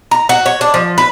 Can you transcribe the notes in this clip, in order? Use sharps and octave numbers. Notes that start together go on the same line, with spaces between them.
A#5
F#4
C#5
D4
F3
B4